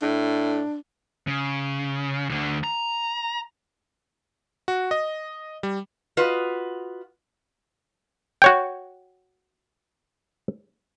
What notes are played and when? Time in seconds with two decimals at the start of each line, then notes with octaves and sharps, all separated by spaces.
0.02 A2 D4
1.27 C#3
2.30 D2 D3
2.64 A#5
4.68 F#4
4.91 D#5
5.63 G3
6.17 F4 F#4 B4 D#5
8.42 F#4 C#5 G5